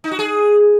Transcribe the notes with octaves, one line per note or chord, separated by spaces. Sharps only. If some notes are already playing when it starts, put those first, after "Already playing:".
D#4
F#4
G#4